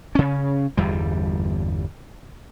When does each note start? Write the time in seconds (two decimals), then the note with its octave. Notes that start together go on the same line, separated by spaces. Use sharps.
0.15 C#3 C#4
0.77 G1 E2 G3